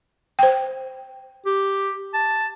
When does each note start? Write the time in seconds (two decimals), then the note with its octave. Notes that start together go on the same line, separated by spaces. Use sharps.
0.39 C5 G5
1.46 G4
2.14 A5